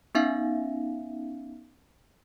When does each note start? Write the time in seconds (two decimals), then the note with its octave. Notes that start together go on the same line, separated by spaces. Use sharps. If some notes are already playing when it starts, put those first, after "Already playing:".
0.15 B3 C#4 D#4 E5 F5